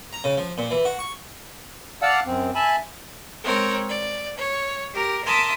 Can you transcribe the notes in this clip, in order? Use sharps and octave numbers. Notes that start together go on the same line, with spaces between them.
A#5
C#3
F3
A#2
E3
F#4
C#6
D5 F5 F#5 A5 E6
F#2 C4
E5 G#5 A5 B5
G#3 C4 A#4 C#5
D5
C#5
G4 A#4
A#4 E5 A5 C6 D6 D#6